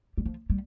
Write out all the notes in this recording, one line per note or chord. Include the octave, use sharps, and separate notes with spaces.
G3
F3
G3